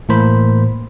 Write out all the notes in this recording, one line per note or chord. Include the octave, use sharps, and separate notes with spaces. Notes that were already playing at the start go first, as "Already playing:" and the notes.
A2 E3 A#3 A#4 C5 B5